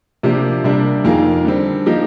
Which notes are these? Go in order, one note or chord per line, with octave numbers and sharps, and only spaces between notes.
C3 F3 A#3 D4 G4
C3 G3 A#3 D4
F2 D#3 A#3 F4 G#4
D3 G3 C4
F3 A#3 D#4 G4